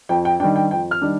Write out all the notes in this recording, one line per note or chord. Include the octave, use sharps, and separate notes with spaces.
F2 G5
G5
D#3 G3 D4 G5
G5
F2 G5
F6
D#3 G3 D4